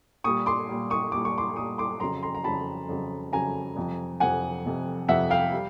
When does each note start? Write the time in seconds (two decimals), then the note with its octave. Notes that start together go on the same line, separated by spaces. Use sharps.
0.24 A#2 G3 C#6 D#6
0.46 C6 D6
0.69 A#2 G3
0.90 C#6 D#6
1.12 A#2 G3 D6
1.25 C#6
1.38 C6 D6
1.56 A#2 G3 C#6 D#6
1.78 C6 D6
2.00 F2 C#3 F#3 A#5 C6
2.23 A#5 C6
2.35 A#5
2.44 F2 C#3 F#3 A5 B5
2.89 F2 C#3 F#3
3.32 F2 C#3 F#3 G#5 A#5
3.76 F2 C3 F3
4.20 F2 C3 F3 F#5 G#5
4.65 F2 C3 F3
5.09 F2 C3 F3 E5 F#5
5.30 F5 G5
5.52 G3